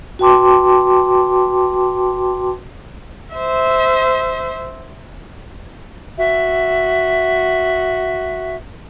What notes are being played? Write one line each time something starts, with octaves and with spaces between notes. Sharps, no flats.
F#4 B4 G5 A5 C6 D6
C5 E5
F#4 E5